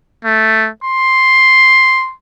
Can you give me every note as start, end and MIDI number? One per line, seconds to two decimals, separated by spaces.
0.24 0.69 57
0.84 2.13 84